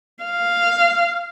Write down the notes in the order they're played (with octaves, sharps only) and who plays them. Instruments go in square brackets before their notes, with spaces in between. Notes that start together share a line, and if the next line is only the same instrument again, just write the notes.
[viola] F5